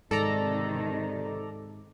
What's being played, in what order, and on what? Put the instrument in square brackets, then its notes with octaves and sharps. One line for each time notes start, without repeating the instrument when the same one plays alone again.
[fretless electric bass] G#2 [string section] C3 D#3 [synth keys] A4 D5 A#5